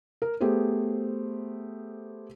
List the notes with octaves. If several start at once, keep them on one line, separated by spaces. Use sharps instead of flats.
A#4
A3 B3 G4 G#4 C5